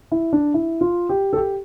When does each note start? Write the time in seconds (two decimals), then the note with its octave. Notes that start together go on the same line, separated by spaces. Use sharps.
0.12 E4
0.33 D4
0.54 E4
0.81 F4
1.09 G4
1.33 A4
1.36 G4